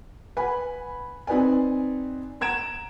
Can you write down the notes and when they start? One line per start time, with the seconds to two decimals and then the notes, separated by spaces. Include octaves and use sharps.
0.37 B4 F#5 G#5 B5
1.27 C4 D#4 B4 D5 G#5
2.41 F#5 A#5 G#6 D7 E7